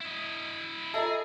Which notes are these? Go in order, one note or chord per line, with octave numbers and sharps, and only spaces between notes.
E4 D#5
F4 G#4 A4 D#5 E5 A#5